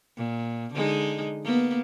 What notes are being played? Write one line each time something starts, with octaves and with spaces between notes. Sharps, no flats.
A#2
D3 G#3 D#4
A#3 B3